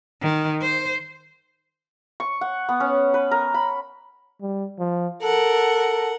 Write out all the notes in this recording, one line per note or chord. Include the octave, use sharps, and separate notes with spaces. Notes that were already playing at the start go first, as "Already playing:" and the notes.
D#3
C5
C#6
F#5
B3
C#4
B4
A#4
B5
G3
F3
A4 A#4 F#5